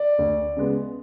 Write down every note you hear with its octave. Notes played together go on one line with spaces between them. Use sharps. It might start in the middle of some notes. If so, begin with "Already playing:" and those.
Already playing: D5
D2
C#3 G#3 B3